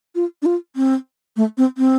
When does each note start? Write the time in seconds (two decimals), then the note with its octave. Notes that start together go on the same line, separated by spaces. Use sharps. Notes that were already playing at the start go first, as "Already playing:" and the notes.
0.15 F4
0.42 D4
0.46 F4
0.76 C4
1.37 A3
1.58 C4
1.78 C4